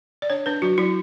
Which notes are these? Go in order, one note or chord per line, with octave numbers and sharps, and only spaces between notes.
D5
D4 C#5
D4 B4
F#3 F#4
F#3 E4